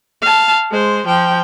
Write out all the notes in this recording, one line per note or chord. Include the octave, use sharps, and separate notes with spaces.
F5 A5
G#3 C5
F3 G5